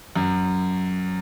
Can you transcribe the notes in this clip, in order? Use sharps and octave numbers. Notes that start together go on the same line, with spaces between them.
F#2